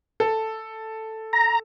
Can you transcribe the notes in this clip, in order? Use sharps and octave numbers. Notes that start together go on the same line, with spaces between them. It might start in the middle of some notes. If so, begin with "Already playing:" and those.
A4
A#5